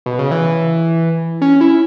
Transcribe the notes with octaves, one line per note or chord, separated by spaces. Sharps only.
B2
C#3
E3
C#4
E4